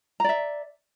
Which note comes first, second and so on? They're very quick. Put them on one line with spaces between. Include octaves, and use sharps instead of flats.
A#5 D5 E5